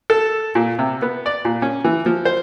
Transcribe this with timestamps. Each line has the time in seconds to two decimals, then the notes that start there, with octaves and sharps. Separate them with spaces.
0.10 A4
0.55 A#2
0.79 C3
1.02 B3
1.26 D5
1.45 A#2
1.62 C#4
1.84 E3
2.06 F3
2.25 C5